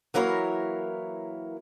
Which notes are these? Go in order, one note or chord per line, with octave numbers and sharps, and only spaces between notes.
E3 F#3 A#3 E4 A#4 C#5